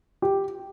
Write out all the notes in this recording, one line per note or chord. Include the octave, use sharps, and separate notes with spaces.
G4